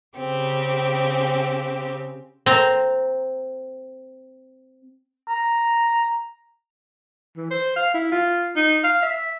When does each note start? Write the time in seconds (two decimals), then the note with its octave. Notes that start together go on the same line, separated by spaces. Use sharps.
0.17 C#3 C4 G4
2.46 C4 A#5
5.28 A#5
7.37 E3
7.51 C5
7.76 F5
7.94 E4
8.12 F4
8.56 D#4
8.84 F5
9.03 E5